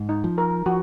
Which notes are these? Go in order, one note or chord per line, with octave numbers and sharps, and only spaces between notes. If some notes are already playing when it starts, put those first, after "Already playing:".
Already playing: G#2
D#4
F3
A#4
F3 F#4